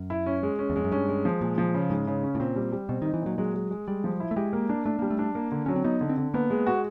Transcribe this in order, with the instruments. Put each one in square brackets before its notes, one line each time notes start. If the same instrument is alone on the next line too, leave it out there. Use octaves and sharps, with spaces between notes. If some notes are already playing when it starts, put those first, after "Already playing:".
Already playing: [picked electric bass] F#2
[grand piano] E4
C#4
G#3
C#4
[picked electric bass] E2
[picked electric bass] F2 [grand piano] G#3
[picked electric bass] F#2
[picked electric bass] G2 [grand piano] C#4
[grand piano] G#3
F3
[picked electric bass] A#2 [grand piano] G#3
[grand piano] F3
C#3
[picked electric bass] G#2 [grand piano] G#3
[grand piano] C#3
C#4
[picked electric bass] A2
[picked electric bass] A#2 [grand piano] C4
[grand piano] G3
G3
[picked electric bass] B2 [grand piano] C4
[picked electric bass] D#3
[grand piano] D#4
[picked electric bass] E3
[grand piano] A#2 [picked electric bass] F#3
[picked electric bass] F#3 [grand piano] G#3
[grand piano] G#3
G#3
[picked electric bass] G3 [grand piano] G#3
[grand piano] F3
E4
[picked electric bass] A3
[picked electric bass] G#3 [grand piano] G4
[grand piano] A#3
D4
[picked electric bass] A3 [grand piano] D4
[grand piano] G3 [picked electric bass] A#3
[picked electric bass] A3
[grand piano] D4
A#3
D3
[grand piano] F#3 [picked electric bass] C#4
[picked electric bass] C4
[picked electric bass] B3 [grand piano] D#4
[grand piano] D3
[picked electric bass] C4
[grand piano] D3
[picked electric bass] A#3 [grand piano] B3
[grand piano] G#3
F#4